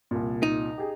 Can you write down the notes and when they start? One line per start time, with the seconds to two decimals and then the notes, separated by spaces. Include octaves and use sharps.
0.11 C2 A#2
0.43 D#4
0.78 G4 G#4